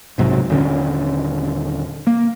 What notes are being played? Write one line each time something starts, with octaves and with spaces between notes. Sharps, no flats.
B1 G#2 C3 F#3
D#1 D3 C#4
A#3